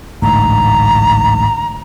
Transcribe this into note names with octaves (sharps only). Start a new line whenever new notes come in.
A1 D2 G#2 A#5